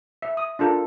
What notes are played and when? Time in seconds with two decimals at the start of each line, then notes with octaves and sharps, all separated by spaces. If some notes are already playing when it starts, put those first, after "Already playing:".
0.22 E5
0.37 D#6
0.59 D4 F4 A4 A#4